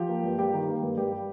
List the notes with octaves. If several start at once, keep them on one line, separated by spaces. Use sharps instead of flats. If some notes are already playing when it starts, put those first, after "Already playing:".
Already playing: F3 G4
A#3
G2
G2 G4
D#3
A#3
G2
G2 G4
G3